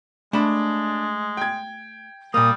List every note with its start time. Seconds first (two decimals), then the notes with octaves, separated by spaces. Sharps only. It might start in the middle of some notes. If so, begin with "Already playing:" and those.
0.33 G#3 A3 D4 A5 B5
1.37 G5 G#6
2.34 A#2 G3 A#3 D#6